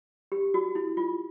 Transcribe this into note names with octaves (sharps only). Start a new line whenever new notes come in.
G4
F#4
E4
F4